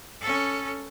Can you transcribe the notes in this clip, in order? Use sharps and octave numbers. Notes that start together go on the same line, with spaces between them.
C#4 A4